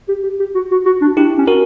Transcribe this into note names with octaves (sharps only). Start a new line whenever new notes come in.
G4
G4
G4
F#4
F#4
F#4
D4
D4 E4 G4
C#4
F#4 A#4